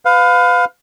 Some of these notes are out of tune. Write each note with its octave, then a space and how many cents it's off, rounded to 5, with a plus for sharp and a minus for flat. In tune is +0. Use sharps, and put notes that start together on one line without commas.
B4 +30 F5 +20